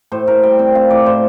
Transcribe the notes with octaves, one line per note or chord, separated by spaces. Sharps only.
A2 C5
A2 A#4
G3 G5
C4
C4 F5
A2 D5
A2 C5